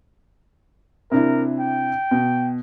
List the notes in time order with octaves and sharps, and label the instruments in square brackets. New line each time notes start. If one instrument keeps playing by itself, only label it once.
[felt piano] C3 D4 E4 [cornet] A#4
[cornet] G5
[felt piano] B2